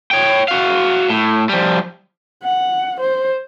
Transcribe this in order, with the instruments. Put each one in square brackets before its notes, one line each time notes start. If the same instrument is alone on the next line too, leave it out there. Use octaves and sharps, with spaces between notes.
[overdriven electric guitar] C#5 G5
F#4 F5
A2
F3 G3
[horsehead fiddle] F#5
C5